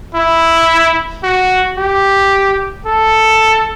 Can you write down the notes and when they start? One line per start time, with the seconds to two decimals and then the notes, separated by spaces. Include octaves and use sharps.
0.14 E4
1.23 F#4
1.78 G4
2.86 A4